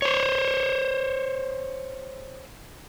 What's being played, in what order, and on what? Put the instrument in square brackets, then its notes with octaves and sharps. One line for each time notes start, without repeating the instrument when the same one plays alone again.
[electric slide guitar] C5 C#5